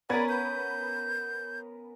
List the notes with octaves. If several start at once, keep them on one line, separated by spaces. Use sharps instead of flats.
B3 C#4 A#4 B4 D5 G#6
G6